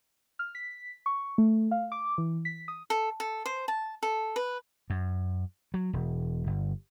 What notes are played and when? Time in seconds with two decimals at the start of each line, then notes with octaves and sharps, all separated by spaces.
0.39 F6
0.55 B6
1.06 C#6
1.38 A3
1.71 F5
1.92 D6
2.18 E3
2.45 B6
2.68 D#6
2.90 A4
3.20 A4
3.46 C5
3.68 A5
4.03 A4
4.36 B4
4.90 F#2
5.74 F#3
5.93 E1
6.47 G1